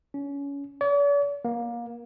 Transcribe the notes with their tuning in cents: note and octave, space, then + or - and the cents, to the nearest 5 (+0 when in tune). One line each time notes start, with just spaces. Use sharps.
C#4 +25
D5 -45
A#3 +25